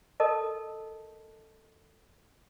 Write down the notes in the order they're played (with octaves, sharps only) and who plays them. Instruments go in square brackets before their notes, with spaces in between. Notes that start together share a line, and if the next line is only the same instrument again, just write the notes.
[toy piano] A4 A#4 D#5 A5